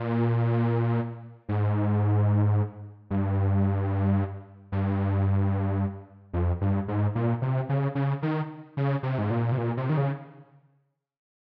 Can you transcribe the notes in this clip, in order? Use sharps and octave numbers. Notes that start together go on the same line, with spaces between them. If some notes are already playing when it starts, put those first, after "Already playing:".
Already playing: A#2
G#2
G2
G2
F2
G2
G#2
A#2
C3
C#3
C#3
D#3
C#3
C3
G#2
A#2
C3
A#2
C3
D#3
C#3